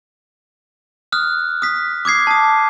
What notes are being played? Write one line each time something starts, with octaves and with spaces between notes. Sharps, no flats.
D#6 F6 F#6
D#6 B6
D6 D#6 G#6 C7
A5 D#6